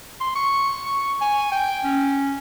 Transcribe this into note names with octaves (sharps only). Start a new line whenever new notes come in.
C6
C#6
C#6
G#5
G5
C#4